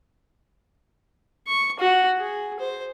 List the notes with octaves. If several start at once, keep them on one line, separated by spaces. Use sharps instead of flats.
C#6
F#4
G#4
C5